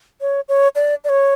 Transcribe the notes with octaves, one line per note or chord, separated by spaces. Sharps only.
C#5
C#5
D5
D5
C#5